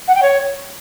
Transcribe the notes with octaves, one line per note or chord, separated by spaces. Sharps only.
F#5
G5
C#5